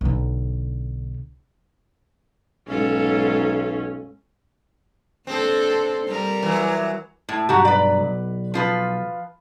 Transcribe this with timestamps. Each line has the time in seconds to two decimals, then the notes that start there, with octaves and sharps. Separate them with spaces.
0.01 B1 D3
2.68 B1 G#2 C#4 F4 A4
5.27 C4 D4 A4 C5
6.07 G3 A#4
6.43 E3 F#3
7.29 A2
7.49 B1 G2 F#4 G4 F#5 A#5
7.65 B4 D5
8.00 B1
8.54 F3 F4 B4